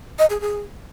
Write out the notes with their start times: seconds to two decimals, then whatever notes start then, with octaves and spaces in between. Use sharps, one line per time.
0.19 D#5
0.30 G#4
0.41 G#4